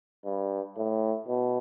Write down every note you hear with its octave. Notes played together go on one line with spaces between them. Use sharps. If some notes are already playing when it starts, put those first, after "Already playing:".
G2
A2
B2